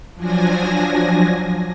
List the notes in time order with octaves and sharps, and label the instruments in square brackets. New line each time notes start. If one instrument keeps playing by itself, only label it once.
[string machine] F3 F#3 D4 G#5 A#6